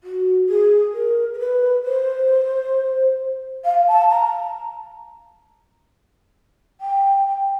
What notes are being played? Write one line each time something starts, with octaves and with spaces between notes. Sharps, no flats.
F#4
G#4
A#4
A#4
B4
C5
F5
A5
A#5
G5
G5